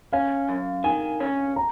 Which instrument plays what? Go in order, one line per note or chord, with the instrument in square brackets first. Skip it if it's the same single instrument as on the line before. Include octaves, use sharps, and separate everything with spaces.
[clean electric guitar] C#4 [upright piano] F5
[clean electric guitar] F#2
[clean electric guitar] D#3 [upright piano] G#5
[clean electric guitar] C#4
[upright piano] A#5